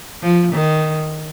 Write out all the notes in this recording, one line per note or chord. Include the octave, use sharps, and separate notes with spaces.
F3
D#3